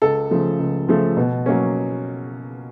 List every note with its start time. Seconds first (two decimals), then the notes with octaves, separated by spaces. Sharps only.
0.02 C#2 A4
0.31 C#3 F3 A3
0.59 C#2
0.88 C#3 F3 A3
1.17 B2
1.46 F#3 A#3 C#4